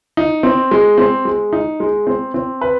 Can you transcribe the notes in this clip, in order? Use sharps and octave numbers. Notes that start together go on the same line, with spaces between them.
D#4
C4
G#3
C4
G#3
D#4
G#3
C4
C4
B4